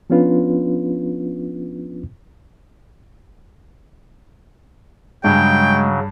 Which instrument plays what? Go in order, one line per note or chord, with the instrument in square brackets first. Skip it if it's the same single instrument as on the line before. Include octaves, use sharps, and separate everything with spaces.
[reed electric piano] F3 B3 C#4 D4 F4 B4
[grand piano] G2 [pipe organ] C#3 F#3 [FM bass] G#3 [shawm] G5